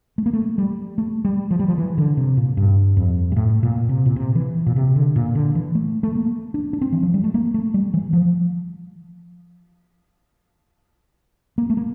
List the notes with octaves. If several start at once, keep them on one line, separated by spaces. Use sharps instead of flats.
A3
A#3
A3
G3
A3
G3
F3
G3
F3
E3
D3
C3
A#2
G2
F2
G2
A2
A#2
C3
A#2
C3
E3
A#2
C3
D3
A#2
D3
E3
A3
A3
A#3
D4
D4
C4
E3
F3
G3
A3
A#3
A3
G3
E3
F3
A#3
A3
A#3